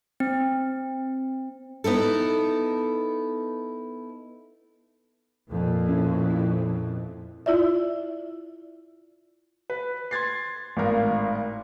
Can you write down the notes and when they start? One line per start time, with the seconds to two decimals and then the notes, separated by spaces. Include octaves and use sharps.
0.20 C4
1.84 B3 D#4 E4 A4
5.50 F2 A#2
5.88 B2 C#4 E4
6.30 E4
7.46 E4 F4 D5 E5
9.70 B4
10.11 C6 G#6 A6 C7
10.77 G#1 A2 A#4 F5